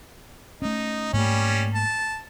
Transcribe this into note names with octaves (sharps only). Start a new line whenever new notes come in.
A3 C#4 D#4
G#2 G3 A3 A#3 C#4
A5